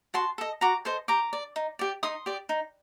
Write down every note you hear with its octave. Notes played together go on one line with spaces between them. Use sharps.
F#4 A5 C6
A4 D#5
F#4 A#5 D6
A4 C5 D#5
G4 A#5 D6
D5
D#4
G4 D5
D#4 C6 D#6
G4 D5
D#4